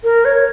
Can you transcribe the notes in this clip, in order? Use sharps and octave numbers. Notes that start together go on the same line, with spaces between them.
A#4
C#5